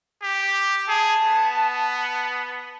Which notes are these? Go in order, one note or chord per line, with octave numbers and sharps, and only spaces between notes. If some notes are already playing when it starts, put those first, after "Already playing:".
G4
G#4 A5
B3